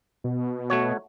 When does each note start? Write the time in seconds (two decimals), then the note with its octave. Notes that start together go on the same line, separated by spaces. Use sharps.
0.24 B2
0.70 A3 F#4 C#5